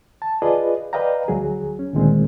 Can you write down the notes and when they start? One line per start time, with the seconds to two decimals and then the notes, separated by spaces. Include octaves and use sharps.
0.22 A5
0.42 F4 G#4 B4 D5 D#5
0.93 B4 D5 D#5 F5 G5 A#5
1.28 D2 F#3 G#4
1.79 C#4
1.94 D2 A#2 D#3 G#3 C4